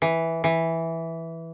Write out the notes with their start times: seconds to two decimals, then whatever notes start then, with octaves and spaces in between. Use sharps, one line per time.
0.02 E3
0.44 E3